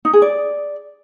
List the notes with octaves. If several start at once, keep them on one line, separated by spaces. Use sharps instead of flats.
D#4
G#4
D5